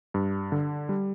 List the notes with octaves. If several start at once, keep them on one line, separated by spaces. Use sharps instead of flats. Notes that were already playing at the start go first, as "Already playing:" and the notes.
G2
D3
G3